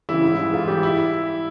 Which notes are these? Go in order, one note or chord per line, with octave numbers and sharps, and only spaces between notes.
C#3 E3 G3 E4
G#2
E3 G3
G#2 F4
E3 G3 G4
E4